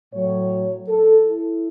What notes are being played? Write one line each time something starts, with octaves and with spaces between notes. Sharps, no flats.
A2 F#3 C#5
A4
E4